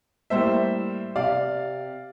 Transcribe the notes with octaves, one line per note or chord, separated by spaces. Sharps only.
A2 G3 A#3 C5 E5
C3 D5 F5